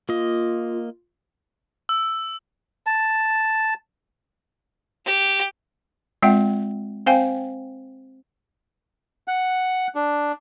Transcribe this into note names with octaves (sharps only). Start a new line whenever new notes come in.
A#3 F4 D#5
E6
A5
G4
G#3 C4 F4 E5 F#5 G5
C4 C5 F5 G5 G#5
F#5
D4